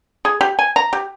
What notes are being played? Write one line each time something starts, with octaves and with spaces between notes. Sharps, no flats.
G#4
G4
G#5
A#5
G4